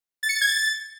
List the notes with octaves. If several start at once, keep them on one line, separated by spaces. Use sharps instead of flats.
A6
C#7
A6
G#6
A6